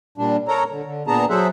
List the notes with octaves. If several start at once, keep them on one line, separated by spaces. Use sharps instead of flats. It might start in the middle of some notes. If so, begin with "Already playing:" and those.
A#2 G3 D4
A4 A#4 C#5 A#5
D3
D3
A#2 B3 D4 G#4 A5 A#5
F#3 G#4 A4 C5 E5 F#5